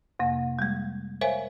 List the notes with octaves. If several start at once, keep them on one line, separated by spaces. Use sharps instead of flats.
F2 C3 A#3
G3 G#3
A#4 C5 C#5 E5 F5 G#5